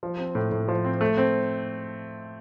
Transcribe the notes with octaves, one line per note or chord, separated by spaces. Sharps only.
F3
C4
A2
A2
F3
C4
A3
C4